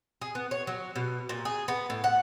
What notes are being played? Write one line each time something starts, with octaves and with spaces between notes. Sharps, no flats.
G#4
B3
C#5
F#3
B2
A#2
G#4
B3
A2
F#5